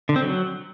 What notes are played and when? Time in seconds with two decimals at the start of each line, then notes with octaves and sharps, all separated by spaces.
0.09 D3
0.16 C4
0.23 F#3